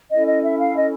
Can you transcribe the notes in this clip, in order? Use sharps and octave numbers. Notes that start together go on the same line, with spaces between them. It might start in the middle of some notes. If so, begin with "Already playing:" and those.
C#4 E4 A4 D#5
D#5
E5
F5
D#5